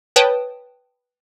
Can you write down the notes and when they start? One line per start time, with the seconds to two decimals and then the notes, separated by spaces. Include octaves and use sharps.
0.16 B4 C#5 G5 A5 D#6